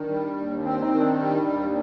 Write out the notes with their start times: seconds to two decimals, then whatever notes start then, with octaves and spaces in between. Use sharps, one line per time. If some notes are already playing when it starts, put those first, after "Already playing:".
Already playing: D#3 D4
0.08 G3
0.36 D#2
0.64 C4
0.82 D#4
0.92 D#3
1.00 D4
1.19 G3
1.48 D#2